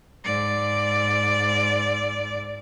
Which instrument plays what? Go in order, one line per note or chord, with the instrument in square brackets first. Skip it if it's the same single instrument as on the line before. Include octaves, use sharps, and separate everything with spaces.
[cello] G#2 D5